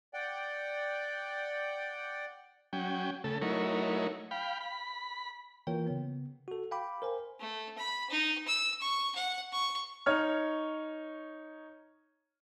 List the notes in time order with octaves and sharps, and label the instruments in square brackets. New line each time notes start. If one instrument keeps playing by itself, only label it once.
[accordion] D5 F#5 G5
[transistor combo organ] F#3 C#4 G5
C#3 A3 A4
F#3 A3 D#4 E4 A#4 C#5
F5 G5 B5
B5
[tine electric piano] E3 A#3 F4 A#4 C#5 G5
C#3 B3
F#4 A4
F5 G5 B5 D6
A#4 C5 G#5
[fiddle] A3
B5
D#4
E6
C#6
F#5
C#6
[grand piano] D#4 C#5 F6